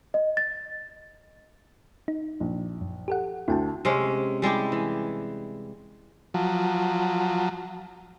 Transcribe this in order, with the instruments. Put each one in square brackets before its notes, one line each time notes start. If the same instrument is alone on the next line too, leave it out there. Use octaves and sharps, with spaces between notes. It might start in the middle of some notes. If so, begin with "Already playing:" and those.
[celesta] D#5
A6
[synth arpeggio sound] D#4
[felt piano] A#1
[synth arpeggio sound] F#2
G4 A4 F#5
[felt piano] D2 [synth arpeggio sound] E4 G5 A5
[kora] C3 G#3 C#4
G3 G#3 E4 G4
E3
[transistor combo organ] F3 F#3